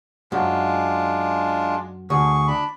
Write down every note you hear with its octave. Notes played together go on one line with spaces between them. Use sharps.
F#2 G#3 D4 F4
D2 G#4 C#6
D4 B5